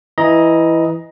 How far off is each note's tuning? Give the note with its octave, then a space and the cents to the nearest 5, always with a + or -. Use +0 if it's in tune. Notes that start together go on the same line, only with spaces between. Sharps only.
E3 +0 D#5 +5 A#5 +20